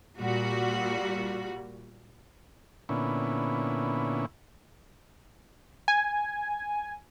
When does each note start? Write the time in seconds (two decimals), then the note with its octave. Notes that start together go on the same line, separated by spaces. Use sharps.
0.19 A#2 G3 F#4
2.89 A#2 D3 B3 C#4 E4
5.88 G#5